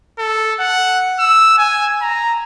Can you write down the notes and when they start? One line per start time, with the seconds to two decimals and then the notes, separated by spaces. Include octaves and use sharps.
0.19 A4
0.60 F#5
1.19 E6
1.58 G#5
2.01 A#5